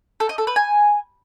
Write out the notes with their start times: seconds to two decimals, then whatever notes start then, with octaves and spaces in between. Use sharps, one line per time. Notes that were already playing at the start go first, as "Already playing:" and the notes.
0.20 A4
0.29 D#5
0.38 A4
0.47 B4
0.56 G#5